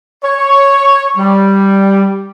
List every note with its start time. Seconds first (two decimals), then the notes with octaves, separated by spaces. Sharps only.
0.23 C#5
1.16 G3